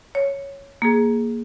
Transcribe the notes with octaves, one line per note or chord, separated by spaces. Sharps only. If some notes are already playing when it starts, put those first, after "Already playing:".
C#5
A#3 G#4